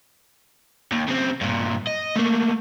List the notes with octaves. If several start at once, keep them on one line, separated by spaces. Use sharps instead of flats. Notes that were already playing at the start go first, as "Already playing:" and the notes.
D#2
C#3 C4
G2 A#2
D#5
A3 A#3